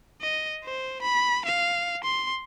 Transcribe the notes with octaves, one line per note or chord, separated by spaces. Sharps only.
D#5
C5
B5
F5
C6